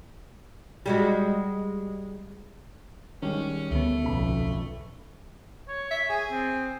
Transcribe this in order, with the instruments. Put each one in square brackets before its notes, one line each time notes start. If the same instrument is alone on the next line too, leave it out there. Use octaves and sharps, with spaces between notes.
[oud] G3 G#3 F#4
[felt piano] D#3 G3 G#3 [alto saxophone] C#4
[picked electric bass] D2 B3 [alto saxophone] A3
[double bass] B1 F2 [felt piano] C#3 B5
[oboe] C#5
[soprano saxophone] E5
[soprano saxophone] G#4 [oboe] G#5
[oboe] C4